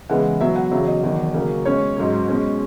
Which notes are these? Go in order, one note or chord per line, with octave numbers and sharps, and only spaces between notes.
C#3 E3 G#3 B3 F#5
B2 F#3 B3 E5
F#5
E2 C#3 F#3 E5
D#5
E2 D#3 F#3
C#3 F#3 A#3 C#4
B2 G#3 C#4 C#5
G#2 F#3 C#4
B2 G#3 C#4